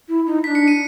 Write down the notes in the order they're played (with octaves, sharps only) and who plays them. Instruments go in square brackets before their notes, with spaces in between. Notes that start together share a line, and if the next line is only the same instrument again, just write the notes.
[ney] E4
D#4
[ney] D#4 [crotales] B6
[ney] D4
[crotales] C#7
D#7